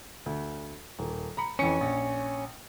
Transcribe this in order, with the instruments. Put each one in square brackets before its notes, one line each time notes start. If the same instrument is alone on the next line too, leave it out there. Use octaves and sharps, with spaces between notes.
[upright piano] D2
D#1 A#3
A#5 B5 C#7
[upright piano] F2 E3 C#7 [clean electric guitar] C#4
[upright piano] A#1